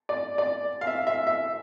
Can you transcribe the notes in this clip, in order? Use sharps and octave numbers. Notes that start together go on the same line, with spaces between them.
D5
D5
F5
E5
E5
E5